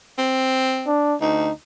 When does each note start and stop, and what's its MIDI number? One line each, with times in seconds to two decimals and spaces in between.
0.18 0.90 60
0.87 1.16 62
1.21 1.49 38
1.21 1.52 63